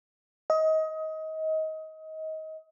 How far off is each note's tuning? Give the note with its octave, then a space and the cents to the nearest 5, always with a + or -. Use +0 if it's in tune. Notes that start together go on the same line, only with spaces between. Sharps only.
D#5 +25